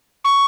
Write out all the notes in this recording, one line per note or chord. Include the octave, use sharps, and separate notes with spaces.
C#6